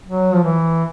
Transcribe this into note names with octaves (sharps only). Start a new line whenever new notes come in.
F#3
F3
E3